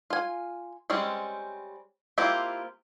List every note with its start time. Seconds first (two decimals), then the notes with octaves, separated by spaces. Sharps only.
0.10 F4 G#5
0.90 G3 G#3 C4 C#4
2.18 A#3 C4 E4 F4 G4